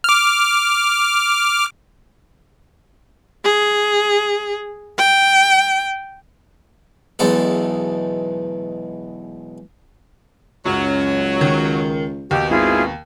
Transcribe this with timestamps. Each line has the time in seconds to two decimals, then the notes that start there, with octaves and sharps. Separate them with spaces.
0.04 D6 F6
3.44 G#4
4.98 G5
7.19 B1 E2 G#3 D#4 A4
10.66 C#2 F#2 F#3
11.41 D#3
12.31 D#2 B2 G4
12.50 G#1 E4 F4 G#4